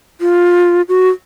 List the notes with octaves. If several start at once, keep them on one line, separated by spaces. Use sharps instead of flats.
F4
F#4